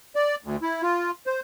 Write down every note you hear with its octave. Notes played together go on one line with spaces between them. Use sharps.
D5
D2
E4
F4
C5